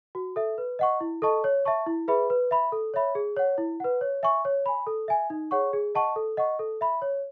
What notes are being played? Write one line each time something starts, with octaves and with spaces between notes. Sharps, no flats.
F#4
A4 E5
B4
D#5 F#5 C#6
E4
A4 D#5 A5 C#6
C#5
E5 A5 C#6
E4
G#4 B4 E5 B5
B4
E5 B5
A4
C#5 E5 B5
G#4
C#5 F#5
E4
B4 F#5
C#5
E5 G#5 C#6
C#5
G#5 B5
A4
E5 G#5
D#4
G#4 C#5 F#5 C#6
G#4
D#5 F#5 A5 C#6
A4
D#5 F#5 C#6
A4
E5 B5
C#5